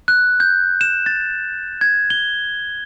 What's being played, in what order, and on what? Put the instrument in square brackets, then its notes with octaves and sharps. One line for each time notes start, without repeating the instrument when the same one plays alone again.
[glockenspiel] F#6
G6
E7
A6
G#6
G7